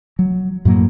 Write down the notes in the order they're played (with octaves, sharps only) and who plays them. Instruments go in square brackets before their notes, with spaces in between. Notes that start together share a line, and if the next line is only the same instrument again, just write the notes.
[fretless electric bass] F#3
F#2 A2 F#3 A#3